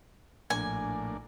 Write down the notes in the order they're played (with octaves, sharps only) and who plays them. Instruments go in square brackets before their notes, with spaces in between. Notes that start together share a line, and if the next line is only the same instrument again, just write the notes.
[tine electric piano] A#1 [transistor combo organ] A2 A#3 D4 [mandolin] G#5